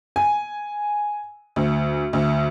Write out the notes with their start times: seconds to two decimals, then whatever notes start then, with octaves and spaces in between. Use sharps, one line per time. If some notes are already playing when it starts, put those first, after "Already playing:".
0.16 G#5
1.56 D2
2.13 D2